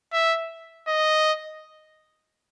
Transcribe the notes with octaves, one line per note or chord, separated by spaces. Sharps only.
E5
D#5